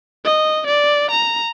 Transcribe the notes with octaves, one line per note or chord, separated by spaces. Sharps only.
D#5
D5
A#5